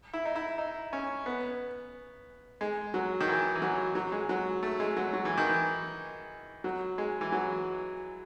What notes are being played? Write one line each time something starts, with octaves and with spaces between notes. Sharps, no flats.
E4
D#4
E4
D#4
C#4
B3
G#3
F#3
D#3
E3
E3
F#3
F#3
G#3
F#3
A3
G#3
F#3
F#3
E3
D#3
E3
F#3
G#3
E3
F#3